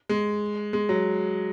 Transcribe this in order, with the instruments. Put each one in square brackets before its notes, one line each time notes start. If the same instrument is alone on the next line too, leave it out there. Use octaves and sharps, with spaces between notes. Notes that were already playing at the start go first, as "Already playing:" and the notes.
[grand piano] G#3
G#3
F#3